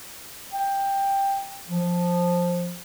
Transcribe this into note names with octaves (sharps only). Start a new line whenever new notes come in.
G5
F3